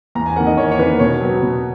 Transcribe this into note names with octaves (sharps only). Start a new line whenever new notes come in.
E2 A#5
G#5
D#3 A#3 F#5
D#5
E2 C#5
C#5
D#3 A#3 B4
B2 C#5
F#3 B3
B2